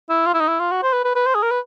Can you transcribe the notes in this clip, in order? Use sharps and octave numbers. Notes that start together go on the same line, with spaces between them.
E4
F4
E4
D#4
E4
F4
F#4
C5
B4
B4
B4
C5
G#4
A#4
B4